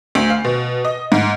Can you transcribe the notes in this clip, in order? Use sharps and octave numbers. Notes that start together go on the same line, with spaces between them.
D2
F5
B2
D#5
G#2